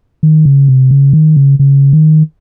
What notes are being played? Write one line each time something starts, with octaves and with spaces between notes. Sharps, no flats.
D#3
C#3
C3
C#3
D#3
C#3
C#3
D#3